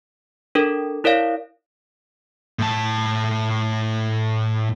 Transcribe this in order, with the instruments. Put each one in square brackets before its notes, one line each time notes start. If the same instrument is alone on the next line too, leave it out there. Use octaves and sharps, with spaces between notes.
[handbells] D4 A4 A#4
E4 A#4 C#5 D5 F5
[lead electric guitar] A2 A5